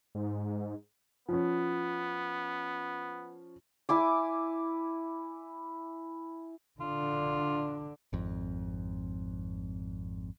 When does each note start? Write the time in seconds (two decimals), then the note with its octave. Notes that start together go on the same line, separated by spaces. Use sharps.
0.15 G#2
1.29 F3 B3 C#4
3.89 E4 G#5 D6
6.81 D3 D4 F4
8.13 G#1 F2